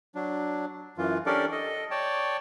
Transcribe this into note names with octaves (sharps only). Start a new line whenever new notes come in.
F#3 D4
F#2 E3 F4
C#4 D4 G4 A4 A#4 D5
A4 D#5
C#5 D5 G5 A5